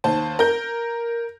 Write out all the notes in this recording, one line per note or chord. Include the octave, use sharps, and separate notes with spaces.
D#2 C5 A5
A#4 G6